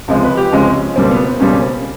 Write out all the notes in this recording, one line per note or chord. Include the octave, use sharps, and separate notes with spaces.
C#2 C3 F3 G#3
B4
G4
C#2 C3 F3 G#3 C#4
C#2 B2 G3 A#3 C4
B3
C4
C#2 B2 G3 A#3 C#4
C#4
C4